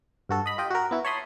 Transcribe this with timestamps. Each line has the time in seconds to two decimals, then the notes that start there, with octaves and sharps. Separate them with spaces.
0.29 G2 F#4 A4
0.46 D#5 B5
0.58 F4 G4 D#5 G5
0.70 F#4 A#4
0.91 B3 E4 F#4
1.05 C#5 A5 B5 C6 D#6